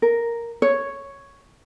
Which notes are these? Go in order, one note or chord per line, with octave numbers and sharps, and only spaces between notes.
A#4
C#5